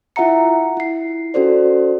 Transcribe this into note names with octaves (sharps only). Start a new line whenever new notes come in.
E4 F4 E5 F#5 A#5 C#7
E4 C7
C#4 F#4 A4 C5 D5